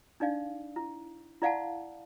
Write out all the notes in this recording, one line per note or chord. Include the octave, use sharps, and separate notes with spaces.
D4 D#4 D5 F5
E4
E4 D5 F5 F#5 A5